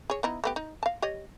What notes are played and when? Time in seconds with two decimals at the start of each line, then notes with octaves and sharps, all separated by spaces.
0.10 G#4 C#5
0.23 B3 D#4 E4
0.44 A3 B3 G4
0.56 D#4
0.83 F5 A5
1.02 G4 C#5 D#5